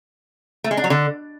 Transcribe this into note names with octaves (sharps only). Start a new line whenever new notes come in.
A3
G#3
D4
F#3
D3